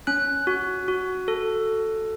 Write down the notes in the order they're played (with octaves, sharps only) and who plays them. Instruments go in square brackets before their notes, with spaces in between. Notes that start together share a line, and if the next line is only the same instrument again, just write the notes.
[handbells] C#4 F#6
F#4
F#4
A4